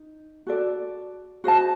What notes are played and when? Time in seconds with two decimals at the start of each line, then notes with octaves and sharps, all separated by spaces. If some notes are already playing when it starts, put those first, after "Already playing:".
Already playing: D#4
0.47 F#4 A4 D5
1.44 F#4 C5 D#5 A5